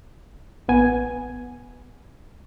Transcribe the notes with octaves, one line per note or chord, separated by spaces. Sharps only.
A1 B3 G#5